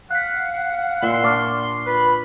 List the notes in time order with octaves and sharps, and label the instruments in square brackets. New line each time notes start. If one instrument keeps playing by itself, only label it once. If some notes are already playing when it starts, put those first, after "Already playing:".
[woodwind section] F5 F#5 [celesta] F#6 B6
[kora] A#2 E5 [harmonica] C6
[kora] D4 [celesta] C#6 D6 F6
[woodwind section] F4 B4 B5